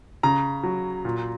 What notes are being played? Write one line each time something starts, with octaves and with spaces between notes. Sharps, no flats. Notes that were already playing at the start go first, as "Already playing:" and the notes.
C#3 A#5
F#3
A#2